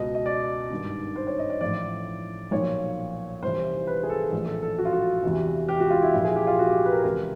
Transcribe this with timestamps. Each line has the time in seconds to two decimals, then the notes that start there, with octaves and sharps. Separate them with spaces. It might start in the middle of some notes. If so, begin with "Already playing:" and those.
Already playing: C#2 B2 D#5
0.15 D#5
0.26 D5
0.70 G#1 G2 D#3
1.16 C5
1.27 C#5
1.39 D#5
1.50 D5
1.61 A1 A2 F3 D5
2.51 B1 A#2 F3 C#5
3.43 C2 C3 E3 C5
3.87 B4
4.03 G#4
4.09 A4
4.32 A#1 A2 E3 A4
4.47 A4
4.62 A4
4.78 F#4
4.85 F4
4.92 F#4
5.23 E2 C3 E3
5.69 G4
5.80 F#4
5.90 F4
6.02 E4
6.14 A#1 A#2 F3 E4
6.25 G#4
6.36 G4
6.47 F4
6.59 F#4
6.70 G4
6.85 B4
6.92 A#4
7.03 C#2 C3 E3 A#4